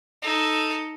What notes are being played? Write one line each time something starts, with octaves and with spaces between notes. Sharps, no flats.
D#4 A4